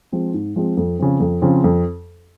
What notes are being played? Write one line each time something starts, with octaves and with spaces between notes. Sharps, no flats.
F3 G#3 C4
G#2
F3 G#3 C4
F2
C#3 F3 C4
F2
C#3 F3 C4
F2